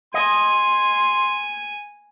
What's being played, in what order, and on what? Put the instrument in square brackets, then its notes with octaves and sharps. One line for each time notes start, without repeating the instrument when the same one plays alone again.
[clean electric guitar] D#5 [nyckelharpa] G#5 [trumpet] C6